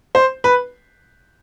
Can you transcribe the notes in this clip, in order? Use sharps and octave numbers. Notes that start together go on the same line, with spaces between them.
C5
B4